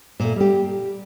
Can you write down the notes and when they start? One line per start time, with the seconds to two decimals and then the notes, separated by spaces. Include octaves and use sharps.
0.20 A#2 A3
0.36 G3 G4